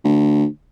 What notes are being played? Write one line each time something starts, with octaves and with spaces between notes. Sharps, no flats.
D2